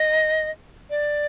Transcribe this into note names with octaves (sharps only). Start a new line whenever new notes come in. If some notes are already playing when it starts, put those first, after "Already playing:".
Already playing: D#5
D5